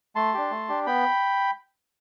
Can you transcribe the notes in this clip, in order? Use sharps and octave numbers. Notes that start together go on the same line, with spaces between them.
A3 A5 C6
D4 G4
A3
D4 G4
B3 G5 B5